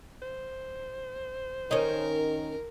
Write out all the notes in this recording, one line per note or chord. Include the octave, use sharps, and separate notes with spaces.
C5
D#3 C#4 D#4 A#4